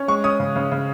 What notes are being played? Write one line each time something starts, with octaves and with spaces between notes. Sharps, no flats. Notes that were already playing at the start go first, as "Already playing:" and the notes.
Already playing: C#4
G#3 C#6
C#4 D#6
C#3
C#3
C#3